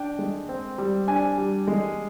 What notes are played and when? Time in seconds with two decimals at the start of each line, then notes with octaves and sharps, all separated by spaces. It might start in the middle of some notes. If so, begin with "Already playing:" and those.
Already playing: D4 G5
0.19 G#3
0.49 C4
0.78 G3
1.08 D4 G#5
1.38 G3
1.67 G#3